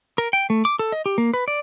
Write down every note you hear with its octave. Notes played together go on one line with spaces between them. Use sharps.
A#4
G5
A3
D6
A4
D#5
G4
A#3
B4
D5